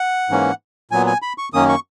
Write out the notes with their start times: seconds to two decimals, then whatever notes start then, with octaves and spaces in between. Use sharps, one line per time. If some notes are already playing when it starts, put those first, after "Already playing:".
Already playing: F#5
0.30 G#2 E3 A#3 C#4
0.91 A#2 F#3 B3 G#5
1.07 G#5
1.22 B5
1.38 C#6
1.53 F#2 D#3 A#3 C#4 D#6
1.69 C#6